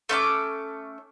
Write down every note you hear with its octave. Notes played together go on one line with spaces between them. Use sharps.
A3 C#4 D6